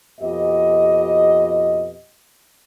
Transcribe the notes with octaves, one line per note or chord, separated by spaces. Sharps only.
F2 B2 G4 D#5